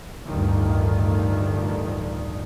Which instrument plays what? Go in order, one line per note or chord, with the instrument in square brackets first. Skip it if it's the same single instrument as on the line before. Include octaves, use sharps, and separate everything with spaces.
[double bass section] A1 D2 G2 D3 D#3 F3